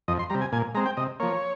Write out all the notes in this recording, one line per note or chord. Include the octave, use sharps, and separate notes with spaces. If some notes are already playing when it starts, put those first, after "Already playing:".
F2 D#5
C6
C3 G3 A#5
G#5
A#2 G#5
G#3 C4 A#5
G5
C3 D#5
F3 A#3 C#5